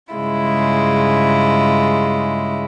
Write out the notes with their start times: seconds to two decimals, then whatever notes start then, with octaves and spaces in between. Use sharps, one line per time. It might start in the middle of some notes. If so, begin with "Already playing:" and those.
0.13 G2 C#3 G#3 E4 F4